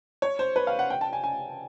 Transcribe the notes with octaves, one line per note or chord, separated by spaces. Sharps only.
C#5
C5
B4
F5
F#5
G5
A5
G#5
G#5